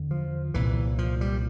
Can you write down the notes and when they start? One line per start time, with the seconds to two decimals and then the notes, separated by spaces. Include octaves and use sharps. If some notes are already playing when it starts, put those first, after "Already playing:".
Already playing: E2 D3
0.11 F3
0.54 C2 A#2 E3
0.98 F3
1.21 G3